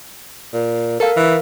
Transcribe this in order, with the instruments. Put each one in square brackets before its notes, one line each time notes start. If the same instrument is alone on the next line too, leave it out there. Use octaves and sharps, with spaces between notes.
[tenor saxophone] A#2
[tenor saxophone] A4 [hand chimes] A#4 F5
[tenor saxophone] E3